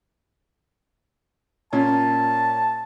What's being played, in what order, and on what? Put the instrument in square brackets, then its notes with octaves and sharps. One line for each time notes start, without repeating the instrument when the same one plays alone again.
[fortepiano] A#2 C#4 [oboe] A5